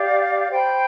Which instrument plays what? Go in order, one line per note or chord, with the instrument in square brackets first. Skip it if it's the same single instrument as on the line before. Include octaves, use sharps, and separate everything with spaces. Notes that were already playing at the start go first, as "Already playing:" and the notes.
Already playing: [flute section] G4 D5 F5
C5 G5 B5